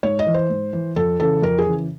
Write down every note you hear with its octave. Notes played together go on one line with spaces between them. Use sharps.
G#2 C#5
D#5
E3
C5
G#2
E3
F2 A4
C#3 E3 A4
F2 A#4
G#4
C#3 E3